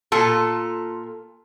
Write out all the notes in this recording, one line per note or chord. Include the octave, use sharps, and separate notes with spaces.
A#2 F4 A4